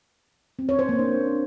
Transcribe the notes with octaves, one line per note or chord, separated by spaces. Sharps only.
C4
C#5
C5
A#3
D4